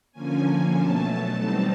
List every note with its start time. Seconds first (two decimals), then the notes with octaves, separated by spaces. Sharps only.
0.12 D3 F3 A#3 C#4 G#5
0.74 B2 F#3 A3 A5
1.36 E3 G3 C4 D#4